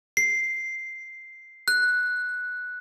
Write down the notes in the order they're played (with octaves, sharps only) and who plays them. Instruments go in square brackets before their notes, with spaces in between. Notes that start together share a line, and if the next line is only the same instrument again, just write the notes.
[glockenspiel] C7
F#6